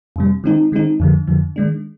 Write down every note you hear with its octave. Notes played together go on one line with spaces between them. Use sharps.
F2 C3 G3
D#3 G#3 C4 D#4
D#3 G#3 C4 D#4
F2 D3 F3
F2 D3 F3
D#3 G#3 D4